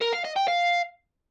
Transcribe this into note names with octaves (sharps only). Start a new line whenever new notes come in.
A#4
F5
D#5
G5
F5